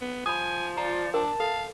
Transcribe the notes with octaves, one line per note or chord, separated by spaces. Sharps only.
B3
F3 G#5 B5 D#6 G6
F4 D5 A#5
D4 A#4 G5 A5
A4 F5